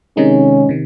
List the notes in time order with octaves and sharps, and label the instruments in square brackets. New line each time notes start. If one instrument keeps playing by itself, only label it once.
[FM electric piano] C3 D#3 G#3 D#4 [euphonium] C#4
[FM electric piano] C3 D#3